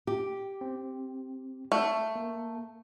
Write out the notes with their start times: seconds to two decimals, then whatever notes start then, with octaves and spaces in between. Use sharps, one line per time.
0.07 G4
0.61 C4
1.72 A3
2.16 A#3